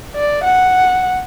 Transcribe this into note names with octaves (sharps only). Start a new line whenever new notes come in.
D5
F#5